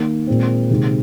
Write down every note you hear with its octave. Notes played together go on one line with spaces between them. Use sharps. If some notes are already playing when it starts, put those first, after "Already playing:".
Already playing: D#3 A#3
A#2 G#3 C4
C3 D#3 G#3 C4